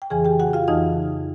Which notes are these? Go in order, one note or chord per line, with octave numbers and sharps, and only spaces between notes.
G5
F2 C#3 E3 G#4 G#5
G4 G5
F#4 F#5
F4 F5
F2 C#3 E3 D#4 D#5